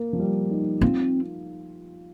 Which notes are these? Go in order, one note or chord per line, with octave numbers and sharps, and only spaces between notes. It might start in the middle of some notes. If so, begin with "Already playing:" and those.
Already playing: A#3
F3
G3
D#4
C4 F4